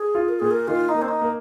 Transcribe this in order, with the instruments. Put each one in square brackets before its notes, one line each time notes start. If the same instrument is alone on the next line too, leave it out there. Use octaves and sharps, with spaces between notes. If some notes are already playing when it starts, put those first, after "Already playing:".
Already playing: [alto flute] G#4
[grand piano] F4
[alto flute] A#4
[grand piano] A#2 [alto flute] G#4
[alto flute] A#4
[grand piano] D#3 [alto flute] F4
[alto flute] D#4
[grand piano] A#3
[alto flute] C4
D#4
[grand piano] A#3